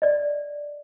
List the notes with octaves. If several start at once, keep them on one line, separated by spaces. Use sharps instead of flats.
D5 D#5